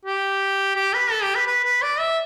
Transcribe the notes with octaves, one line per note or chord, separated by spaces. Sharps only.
G4
G4
B4
A4
G4
B4
B4
B4
D5
E5